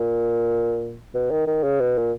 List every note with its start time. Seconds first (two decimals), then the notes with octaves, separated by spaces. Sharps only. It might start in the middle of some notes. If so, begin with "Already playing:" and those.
Already playing: A#2
1.14 B2
1.30 D#3
1.47 D#3
1.63 C#3
1.80 B2
1.97 A#2